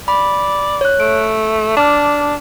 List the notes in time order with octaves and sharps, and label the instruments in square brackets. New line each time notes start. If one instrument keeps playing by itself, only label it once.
[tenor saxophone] D5 [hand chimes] B5
[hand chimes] C#5 F#6
[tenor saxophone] A3 [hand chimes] D7
[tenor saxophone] D4 [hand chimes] A5 D6 F6